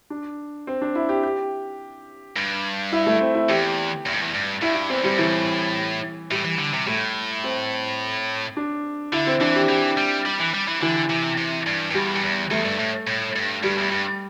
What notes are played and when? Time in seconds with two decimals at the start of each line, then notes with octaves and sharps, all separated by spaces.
0.10 D4
0.67 C4
0.82 D4
0.95 E4
1.09 G4
1.23 G4
2.36 G2
2.92 E4
3.06 A3
3.21 C4
3.35 E4
3.49 E2 G4
4.06 E2
4.13 G2
4.21 E2
4.33 G2
4.61 G2 E4
4.75 E4
4.89 E2 C4
5.04 G2 G3
5.18 A2 E3
6.31 A2 G3
6.45 E3
6.59 D3
6.73 C3
6.87 A2 A3
7.44 C4
8.57 D4
9.13 D3 E4
9.27 C4
9.41 E3 D4
9.55 G4
9.69 E3 G4
9.97 G3
10.25 G3
10.40 E3
10.54 G3
10.68 E3
10.81 D3 E3
11.10 C3
11.38 C3
11.66 G2
11.90 G2
11.94 E2 G3
12.15 G2
12.23 E2
12.51 E2 A3
12.65 G2
12.79 A2
13.07 A2
13.36 G2
13.63 G2 G3
13.78 E2
13.92 G2